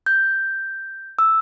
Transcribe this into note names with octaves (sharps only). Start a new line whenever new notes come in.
G6
E6